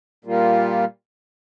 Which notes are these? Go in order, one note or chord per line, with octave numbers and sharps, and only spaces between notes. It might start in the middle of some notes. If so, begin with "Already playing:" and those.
A#2 G3 A#3 F4